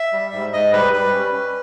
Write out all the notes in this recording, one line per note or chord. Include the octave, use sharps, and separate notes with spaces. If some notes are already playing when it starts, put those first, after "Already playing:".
Already playing: E5
G3
G#2
G#2 D#5
G3 B4
G3 B4
C#4
C#4